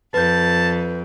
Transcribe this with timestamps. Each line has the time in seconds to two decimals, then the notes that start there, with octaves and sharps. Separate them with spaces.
0.14 F2 B4 A5 G6